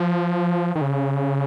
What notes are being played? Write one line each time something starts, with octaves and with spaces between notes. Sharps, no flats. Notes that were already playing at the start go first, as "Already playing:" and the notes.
Already playing: F3
D#3
C#3